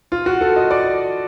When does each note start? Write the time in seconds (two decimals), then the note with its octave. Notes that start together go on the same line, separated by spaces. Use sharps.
0.12 F4
0.26 F#4
0.41 A4
0.56 D#5
0.71 D5